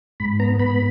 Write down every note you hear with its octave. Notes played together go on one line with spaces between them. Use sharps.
G#2 B5
B3 A#5
G#2 B5